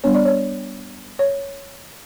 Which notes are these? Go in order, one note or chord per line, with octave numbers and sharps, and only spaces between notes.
G3 B3 D4 C#5
D5
C#5
C#5